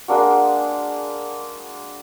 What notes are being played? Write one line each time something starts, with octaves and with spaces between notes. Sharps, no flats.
G#3 A#3 D4 F#4